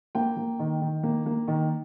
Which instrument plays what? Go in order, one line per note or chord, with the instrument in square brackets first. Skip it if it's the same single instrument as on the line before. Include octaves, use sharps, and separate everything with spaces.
[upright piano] A#3 G5
A#3
D#3
D#3
A#3
A#3
D#3